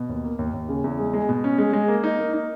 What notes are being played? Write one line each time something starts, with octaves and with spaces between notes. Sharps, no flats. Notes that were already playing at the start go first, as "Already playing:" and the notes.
Already playing: B2
D#2
A#3
D#2
D#2
C#3
E2
G#3
G#3
B2
C#4
G#3
G#3
A#3
D#4
A#3
D#4